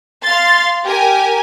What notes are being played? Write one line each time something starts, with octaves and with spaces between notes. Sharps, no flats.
F5 C6 A6
G4 A#4 G#5